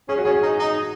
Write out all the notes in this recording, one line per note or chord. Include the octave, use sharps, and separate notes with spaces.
C#4 G#4
F#4
C#4 G#4
D#4
D#4